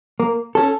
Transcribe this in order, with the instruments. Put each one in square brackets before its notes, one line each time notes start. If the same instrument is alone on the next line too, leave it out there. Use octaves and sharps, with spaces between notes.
[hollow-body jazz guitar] A#3
C#4 A4